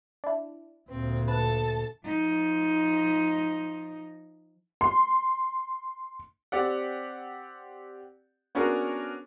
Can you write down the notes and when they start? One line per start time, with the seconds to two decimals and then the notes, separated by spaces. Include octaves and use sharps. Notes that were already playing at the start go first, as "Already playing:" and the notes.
0.24 D4 E4
0.90 D2 A#2 C4
1.28 A4 B4 A5
2.06 F3 D#4
4.81 C6
6.52 C4 G4 D5 F#5
8.55 B3 C#4 D4 F#4 G#4 A#4